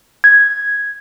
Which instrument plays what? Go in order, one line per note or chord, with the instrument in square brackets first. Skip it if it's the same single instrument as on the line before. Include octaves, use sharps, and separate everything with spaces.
[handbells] G#6